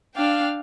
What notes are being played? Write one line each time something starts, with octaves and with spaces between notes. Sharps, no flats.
D4 F5 G5